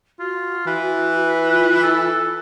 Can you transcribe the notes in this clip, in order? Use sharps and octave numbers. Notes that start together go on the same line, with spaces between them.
F4 F#4
E3 B4
F4
A4